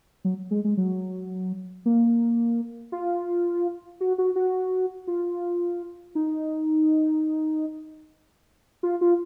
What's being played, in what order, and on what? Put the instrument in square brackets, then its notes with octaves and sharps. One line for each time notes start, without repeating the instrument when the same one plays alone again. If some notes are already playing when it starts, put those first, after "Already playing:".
[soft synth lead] F#3
G#3
G#3
F#3
A#3
F4
F#4
F#4
F#4
F4
D#4
F4
F4